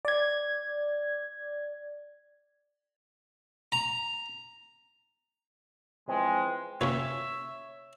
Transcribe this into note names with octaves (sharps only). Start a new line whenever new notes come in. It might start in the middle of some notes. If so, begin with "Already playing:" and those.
D5 G#6
A#5
E3 F3 G#3 C4
C3 A#3 C#4 F4 B4 C#5 E5